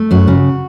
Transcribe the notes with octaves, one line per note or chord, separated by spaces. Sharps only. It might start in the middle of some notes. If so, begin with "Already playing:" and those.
Already playing: A3
F#2 F#4
C#3